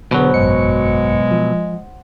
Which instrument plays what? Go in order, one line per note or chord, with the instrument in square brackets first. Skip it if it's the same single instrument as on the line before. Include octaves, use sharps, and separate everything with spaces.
[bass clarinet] E2 [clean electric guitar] B2 F#3 [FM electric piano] D3 B3 [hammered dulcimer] C5 F#5
[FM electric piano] G#1 F#2 C#7 [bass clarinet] G#3
[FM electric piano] F3